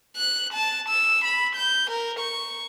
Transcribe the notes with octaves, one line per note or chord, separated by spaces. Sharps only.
F#6
A5
E6
B5
G6
A#4
C#6